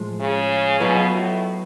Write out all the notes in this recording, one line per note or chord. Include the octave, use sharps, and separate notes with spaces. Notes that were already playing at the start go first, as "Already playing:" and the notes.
Already playing: A2 F3 G#3
C#3
B2 F#3 B3 F4 G#4
A2